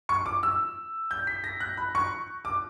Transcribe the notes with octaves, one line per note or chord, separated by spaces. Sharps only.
C#6
D6
E6
G6
B6
A#6
F#6
B5
C#6
D6